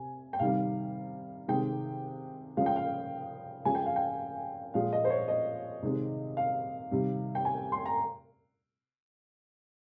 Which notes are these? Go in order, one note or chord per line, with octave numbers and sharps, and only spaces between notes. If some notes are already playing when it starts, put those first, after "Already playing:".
Already playing: C3 G#5
G5
C3 D#3 G3 F5
C3 D#3 G#3 G5
C#3 F3 G#3 F5
G5
F5
C#3 F3 G#3 G#5
G5
F5
G5
A#2 F3 G#3 F5
D#5
C5
C#5
D#5
C3 D#3 G#3
F5
C3 D#3 G3
G5
G#5
C6
A#5